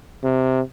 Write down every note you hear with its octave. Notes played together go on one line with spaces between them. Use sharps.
C3